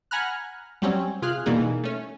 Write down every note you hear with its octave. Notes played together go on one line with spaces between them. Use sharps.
F#5 G#5 A#5 B5 F6 F#6
F#3 G3 C4 C#4
C3 F4 G#4 F6 F#6
B2 E3 G3 A#3 D#4 G#4
A3 C#4